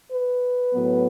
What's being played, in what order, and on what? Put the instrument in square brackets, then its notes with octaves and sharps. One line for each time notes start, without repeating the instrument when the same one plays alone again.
[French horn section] B4
A2 F#3 B3